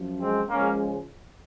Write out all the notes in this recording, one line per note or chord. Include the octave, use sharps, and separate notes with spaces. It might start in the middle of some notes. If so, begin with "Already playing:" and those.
Already playing: F#2 F3
G#3 C4
C#2 C#3 F3 G#3 A#3 C#4